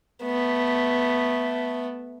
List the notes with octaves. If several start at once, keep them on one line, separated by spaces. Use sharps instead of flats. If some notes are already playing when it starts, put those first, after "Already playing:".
A3 B3